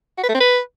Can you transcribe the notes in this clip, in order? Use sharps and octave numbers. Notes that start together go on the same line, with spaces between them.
F#4
B4
A3
C4
B4